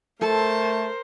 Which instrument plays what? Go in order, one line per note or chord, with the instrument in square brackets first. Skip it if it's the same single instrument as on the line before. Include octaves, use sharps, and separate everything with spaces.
[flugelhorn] A3 [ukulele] A4 [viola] A#4 C5 [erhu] A5